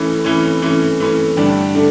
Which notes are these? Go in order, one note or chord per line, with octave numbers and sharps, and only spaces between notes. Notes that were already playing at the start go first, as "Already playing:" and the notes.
Already playing: E3 A3 C#4
E3 A3 C#4
E3 A3 C#4
E3 A3 C#4
G2 D3 A3 D4 G4
D3 A3 D4